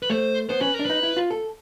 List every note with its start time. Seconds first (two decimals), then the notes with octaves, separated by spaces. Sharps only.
0.02 B4
0.10 A3 C5
0.49 B3 C5
0.60 C#4 B4
0.74 A#4
0.79 D4
0.85 D#4 B4
1.03 E4
1.17 F4
1.31 A4